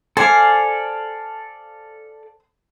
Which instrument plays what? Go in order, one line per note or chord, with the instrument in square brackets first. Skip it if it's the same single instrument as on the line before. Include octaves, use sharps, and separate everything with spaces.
[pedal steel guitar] A4 D5 F5 [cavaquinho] C5 G#5